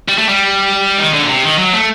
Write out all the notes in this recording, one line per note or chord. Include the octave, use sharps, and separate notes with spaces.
G3
A3
G3
D#3
D3
A#2
C3
D#3
F#3
A3